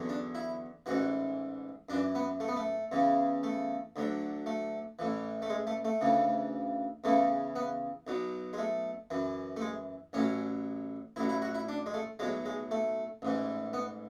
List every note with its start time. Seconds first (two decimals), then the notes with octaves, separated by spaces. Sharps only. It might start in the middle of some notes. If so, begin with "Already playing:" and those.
Already playing: E2 D3 F#3
0.09 D4
0.35 E4
0.86 A1 G#2 E3 F#4
1.89 F#2 D4
1.93 E3
2.15 B3
2.40 A3
2.48 B3
2.56 A3
2.92 E2 C#3 E3
3.43 A3
3.96 D2 D3 F#3
4.46 A3
4.99 A1 A2 E3
5.42 A3
5.50 G#3
5.67 A3
5.85 A3
6.01 D2 C#3 E3
7.04 E2 C#3 E3 A3
7.56 B3
8.07 B1 B2 F#3
8.53 G#3
8.58 A3
9.10 F#2 E3
9.57 A3
9.61 G#3
10.13 A1 A2 F#3 C#4
11.16 A1 A2 F#3 E4
11.29 E4
11.42 F#4
11.55 E4
11.68 D4
11.86 G#3
11.94 A3
12.19 B1 A2 F#3 G#3
12.45 G#3
12.71 A3
13.22 A1 G#2 E3
13.73 B3